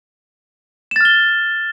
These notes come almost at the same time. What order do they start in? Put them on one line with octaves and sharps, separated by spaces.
E7 A6 F6 G7